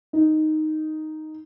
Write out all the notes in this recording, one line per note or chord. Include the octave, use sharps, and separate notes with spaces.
D#4